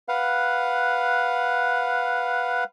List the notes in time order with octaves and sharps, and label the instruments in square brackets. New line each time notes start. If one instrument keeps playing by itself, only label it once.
[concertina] B4 F5 F#5